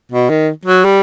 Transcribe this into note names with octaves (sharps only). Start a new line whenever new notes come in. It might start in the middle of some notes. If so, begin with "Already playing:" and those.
B2
D#3
F#3
G3